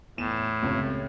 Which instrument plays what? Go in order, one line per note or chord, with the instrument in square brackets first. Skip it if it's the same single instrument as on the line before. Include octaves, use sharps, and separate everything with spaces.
[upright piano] E2 E7 [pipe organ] A2
[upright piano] C#2 C3 C#5